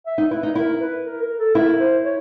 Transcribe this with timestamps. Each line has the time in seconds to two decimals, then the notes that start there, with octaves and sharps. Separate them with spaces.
0.06 E5
0.18 D#4
0.31 E4 B4
0.43 D#4
0.55 E4 A#4
0.81 B4
1.06 A#4
1.22 A#4
1.39 A4
1.55 E4 A#4
1.80 C5
2.05 C#5